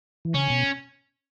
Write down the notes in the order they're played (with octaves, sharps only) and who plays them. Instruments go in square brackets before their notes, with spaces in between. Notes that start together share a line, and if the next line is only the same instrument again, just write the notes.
[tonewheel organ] E3
[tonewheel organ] C#3 [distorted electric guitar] C#4
[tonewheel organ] B2